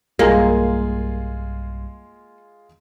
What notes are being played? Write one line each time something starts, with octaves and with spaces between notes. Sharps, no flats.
B1 G2 G3 G#3 A#3 F4 G#4